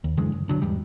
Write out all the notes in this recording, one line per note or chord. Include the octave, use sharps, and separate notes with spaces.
D#2
F#2 D3 E3 G#3
F#1
B1 D3 F#3
E2 G#2 G3